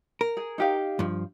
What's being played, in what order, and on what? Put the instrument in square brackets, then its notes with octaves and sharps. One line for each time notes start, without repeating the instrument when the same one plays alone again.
[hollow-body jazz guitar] A#4
[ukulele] G#4
D#4 G4 F5
[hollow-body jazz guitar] G2 F3